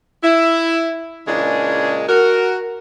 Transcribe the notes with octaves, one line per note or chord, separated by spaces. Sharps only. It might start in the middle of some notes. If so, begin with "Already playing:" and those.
E4
A#2 C#3 E3 G#3 D4 G#4
F#4 A#4